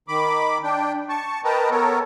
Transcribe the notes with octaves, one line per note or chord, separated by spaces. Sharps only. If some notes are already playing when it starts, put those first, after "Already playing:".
D#3 B5 D6
D4 G5
A5 C#6
A#4 B4 D#5 G5 A5 A#5
B3 A4 A#4 C#5